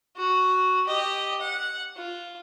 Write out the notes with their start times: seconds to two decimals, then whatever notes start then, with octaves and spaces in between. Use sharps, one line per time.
0.17 F#4
0.87 G4 D#5
1.41 F#5
1.97 F4